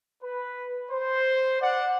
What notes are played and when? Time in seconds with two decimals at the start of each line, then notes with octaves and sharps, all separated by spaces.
0.23 B4
0.91 C5
1.61 D5 F#5